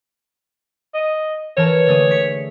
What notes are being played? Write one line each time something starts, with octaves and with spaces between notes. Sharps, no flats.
D#5
E3 A#4 C#5 A5
D3 A3 G#4
B6 C#7